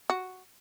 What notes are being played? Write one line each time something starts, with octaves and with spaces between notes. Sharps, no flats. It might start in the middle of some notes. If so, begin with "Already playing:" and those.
F#4